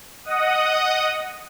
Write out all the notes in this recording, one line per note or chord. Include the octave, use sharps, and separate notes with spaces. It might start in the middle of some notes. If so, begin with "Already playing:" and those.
D#5 F#5 D#6